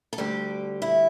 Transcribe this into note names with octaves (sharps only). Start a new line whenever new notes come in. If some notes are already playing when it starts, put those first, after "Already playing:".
A4
D2 D3 G3 G4
E4